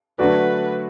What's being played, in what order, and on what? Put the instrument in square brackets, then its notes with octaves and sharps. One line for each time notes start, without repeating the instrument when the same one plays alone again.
[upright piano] D3 F#3 A3 F#4 D5 [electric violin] B4